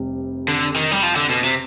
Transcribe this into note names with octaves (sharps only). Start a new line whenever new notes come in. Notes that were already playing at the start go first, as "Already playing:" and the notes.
Already playing: F1 C3 G3
D3
D#3
G3
F3
D3
B2
C3